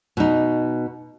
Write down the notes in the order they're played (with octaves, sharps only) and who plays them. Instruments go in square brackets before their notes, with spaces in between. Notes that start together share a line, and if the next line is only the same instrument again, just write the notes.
[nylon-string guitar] B2 D#4